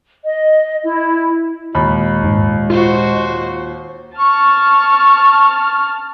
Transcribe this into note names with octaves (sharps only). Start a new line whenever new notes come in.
D#5
E4
D#2 A#2 G#3 B5
G#2
F4 F#4 C5
A5 C#6 F6